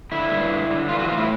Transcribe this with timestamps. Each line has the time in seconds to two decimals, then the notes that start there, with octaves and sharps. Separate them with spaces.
0.12 D3 E4
0.31 G2
0.51 D3
0.71 D3
0.89 E3 F4
0.99 F#4
1.09 A2 F4
1.18 E4